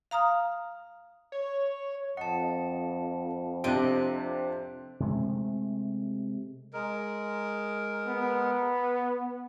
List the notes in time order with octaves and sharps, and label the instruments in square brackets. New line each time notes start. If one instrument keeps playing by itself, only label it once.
[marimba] F5 A#5 D#6 F6
[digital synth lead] C#5
[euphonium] F2 [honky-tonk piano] D#5 [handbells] F#5 A5
[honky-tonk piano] C3 D4 G4 [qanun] C4 D#5 [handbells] F#6 D7
[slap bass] C3 G#3 A3
[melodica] G#3 A#4
[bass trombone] B3